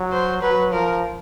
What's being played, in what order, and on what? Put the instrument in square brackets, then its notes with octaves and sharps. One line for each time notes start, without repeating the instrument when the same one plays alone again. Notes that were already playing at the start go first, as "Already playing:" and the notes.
Already playing: [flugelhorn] F#3
[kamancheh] C5
[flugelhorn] F#3 [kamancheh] B4
[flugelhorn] F3 [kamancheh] A#4